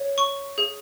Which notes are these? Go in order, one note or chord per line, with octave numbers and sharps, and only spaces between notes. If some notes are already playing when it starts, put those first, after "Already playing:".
Already playing: C#5
C#6
G#4